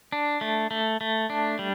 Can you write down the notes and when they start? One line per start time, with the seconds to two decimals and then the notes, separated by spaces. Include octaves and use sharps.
0.12 D4
0.41 A3
0.71 A3
1.01 A3
1.30 D4
1.59 G3